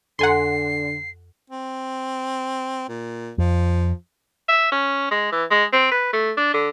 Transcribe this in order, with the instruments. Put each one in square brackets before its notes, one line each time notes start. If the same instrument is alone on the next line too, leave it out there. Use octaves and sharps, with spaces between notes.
[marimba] F2 A4 A#5 [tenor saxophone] D3 [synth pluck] F#5 G#5 C6 [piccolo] C7
[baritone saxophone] C4
A#2
[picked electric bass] F2 [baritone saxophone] F3
[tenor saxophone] E5
C#4
G#3
E3
G#3
C4
B4
A3
D4
D3